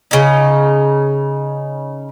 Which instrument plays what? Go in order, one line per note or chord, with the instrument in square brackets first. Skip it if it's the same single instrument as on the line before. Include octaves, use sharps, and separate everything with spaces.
[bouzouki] C#3 D#4